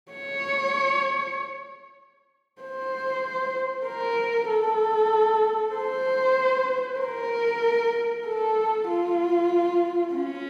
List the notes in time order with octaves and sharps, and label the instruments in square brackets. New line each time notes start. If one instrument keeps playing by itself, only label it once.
[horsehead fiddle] C#5
C5
A#4
A4
C5
A#4
A4
F4
C#4